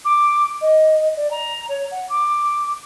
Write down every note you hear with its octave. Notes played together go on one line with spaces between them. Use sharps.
D6
D#5
D5
A#5
C#5
F#5
D6